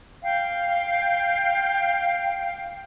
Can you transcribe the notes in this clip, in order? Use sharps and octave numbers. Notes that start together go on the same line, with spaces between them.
F5 G5